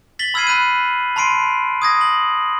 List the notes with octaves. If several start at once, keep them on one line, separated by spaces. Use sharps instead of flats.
A6 B6 F#7 G7
B5 E6 F6 G#6 C7 D#7
B5 F#6 D#7
A5 B5 C6 C7 D7 D#7
D#6 G#6 A#6
F#7